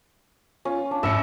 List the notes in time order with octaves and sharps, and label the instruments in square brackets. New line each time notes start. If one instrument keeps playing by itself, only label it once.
[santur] C#4 [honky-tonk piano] F4
[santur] D4
[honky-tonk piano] A1 C#7 [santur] E5 B5